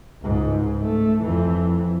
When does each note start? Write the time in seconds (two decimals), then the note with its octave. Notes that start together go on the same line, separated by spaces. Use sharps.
0.23 C#2 G#2
0.81 A3
1.22 F2 E3